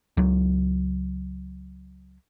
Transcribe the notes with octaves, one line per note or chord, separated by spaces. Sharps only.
C#2 F#3